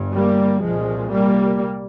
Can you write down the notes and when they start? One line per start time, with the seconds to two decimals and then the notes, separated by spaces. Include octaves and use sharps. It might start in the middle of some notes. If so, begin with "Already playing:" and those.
Already playing: G1 G2
0.13 G3 A#3
0.62 C2 A#2 F3 G#3
1.11 G3 A#3